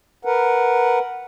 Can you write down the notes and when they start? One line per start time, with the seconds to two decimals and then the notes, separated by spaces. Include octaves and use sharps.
0.25 A#4 B4 F#5